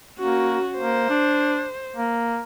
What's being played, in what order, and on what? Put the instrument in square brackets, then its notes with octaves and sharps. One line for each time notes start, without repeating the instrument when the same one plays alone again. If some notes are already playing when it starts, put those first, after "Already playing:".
[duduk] A#3 [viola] C#4 F#4
[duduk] A#3 [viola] C5
[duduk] D4
A#3